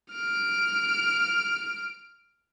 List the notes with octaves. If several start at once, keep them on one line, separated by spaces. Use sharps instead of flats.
F6 D7